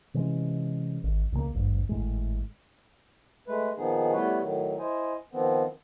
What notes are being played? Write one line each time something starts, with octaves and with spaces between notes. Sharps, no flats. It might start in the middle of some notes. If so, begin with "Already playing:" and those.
C3 E3 G#3 C#4
G#1
C#2 C#3 E3 A#3
G#1 D2 G2
G#1 A2 G#3
G#3 A3 B4
A#2 D#3 F3 B3 D#4 G#4
G3 A3 B3 E4 B4 C#5
A2 D#3 F#3
E4 C5 D#5 G#5
D#3 F3 B3 C4